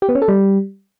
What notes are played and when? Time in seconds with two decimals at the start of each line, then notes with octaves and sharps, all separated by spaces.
0.02 G4
0.09 B3
0.15 C#4
0.22 A4
0.28 G3